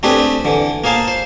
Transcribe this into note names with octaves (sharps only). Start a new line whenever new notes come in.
A3 C4 D4 G4 G#4 B4
D3 E3
A#3 G#4 C5 F5 A5
C5